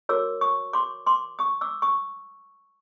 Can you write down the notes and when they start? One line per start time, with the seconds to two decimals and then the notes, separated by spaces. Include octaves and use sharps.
0.09 F#4 A#4 C#5 D6 E6
0.41 C#6 D#6
0.73 C6 D6
1.06 C6 D6
1.39 C#6 D#6
1.61 D6 E6
1.82 C#6 D#6